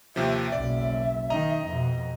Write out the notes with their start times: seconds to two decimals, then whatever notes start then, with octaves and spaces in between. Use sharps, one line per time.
0.16 D#2 C3 F3 E5
0.52 F#1 B1 D5
1.30 D#3 D#4 D#5 A#5
1.67 F2 B2